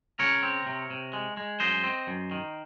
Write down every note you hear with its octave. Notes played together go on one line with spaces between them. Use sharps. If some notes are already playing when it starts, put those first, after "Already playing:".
C#3 A#4 C#5
C4
C3
C3
G#3
G#3
F#2 C5 D#5
C4
F#2
D#3